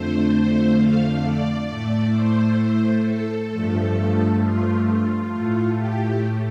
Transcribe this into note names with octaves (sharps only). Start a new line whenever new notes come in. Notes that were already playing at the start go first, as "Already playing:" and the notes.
Already playing: F2 D3 A3 C5
C5
F5
D5
A2 A3
C5
A4
G2 F3 A3
F4
F4
A2 A3
G4